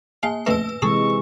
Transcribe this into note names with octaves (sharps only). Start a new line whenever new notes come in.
A#3 F5 G#5
F2 C#3 A3 B4 E6
C3 E3 G#3 G#4 A4 C#6